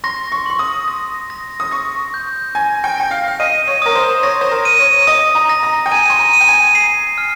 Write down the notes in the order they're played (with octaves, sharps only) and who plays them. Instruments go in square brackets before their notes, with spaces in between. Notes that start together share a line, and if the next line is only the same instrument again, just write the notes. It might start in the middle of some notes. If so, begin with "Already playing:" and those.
[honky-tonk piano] C6 [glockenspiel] A#6
[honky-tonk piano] C#6
[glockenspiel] C6 [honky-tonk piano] C#6
[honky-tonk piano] D#6
[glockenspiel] A#6
A#6
[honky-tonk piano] D#6
[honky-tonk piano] C#6 [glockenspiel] A#6
[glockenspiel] G6
[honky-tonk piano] G#5 [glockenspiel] A#6
[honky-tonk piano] G5
[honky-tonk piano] G5 [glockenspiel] A#6
[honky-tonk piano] F5
F5
[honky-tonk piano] D#5 [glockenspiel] D#7
[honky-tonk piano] C#5
[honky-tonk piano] A#4 [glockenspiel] D#6
[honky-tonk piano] C5
[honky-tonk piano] C#5 [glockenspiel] A#6
[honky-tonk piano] C5
A#4
[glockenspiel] D#7
[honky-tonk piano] C#5
[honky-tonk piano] D#5 [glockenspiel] D#6
[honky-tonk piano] A#5
[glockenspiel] A#6
[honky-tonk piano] A#5
G5
[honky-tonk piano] G#5 [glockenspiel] D#7
[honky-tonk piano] C6
A#5
[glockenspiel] D#7
[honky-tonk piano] G5
G#5
[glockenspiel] C7
F6